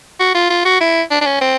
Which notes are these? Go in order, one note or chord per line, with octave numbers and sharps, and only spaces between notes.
F#4
F4
F4
F#4
E4
D4
D4
C#4
C4